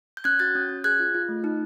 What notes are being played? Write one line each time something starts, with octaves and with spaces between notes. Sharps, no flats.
G6
C#4 F#6 G#6
F#4 G6 A6
C#4
C#4
G#4 F#6 G#6
F4
F4
A3
D#4